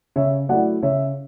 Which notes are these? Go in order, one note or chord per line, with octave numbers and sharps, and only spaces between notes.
C#3 C#5 E5
F#3 A3 E4 D5 F#5
C#3 C#5 E5